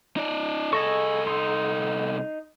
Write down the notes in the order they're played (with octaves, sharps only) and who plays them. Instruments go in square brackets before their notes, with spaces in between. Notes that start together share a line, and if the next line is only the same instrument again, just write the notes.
[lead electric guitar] D#4 D5
[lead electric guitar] C2 A4 [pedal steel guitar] G#4 D#5 C#6
[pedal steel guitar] D#4 C6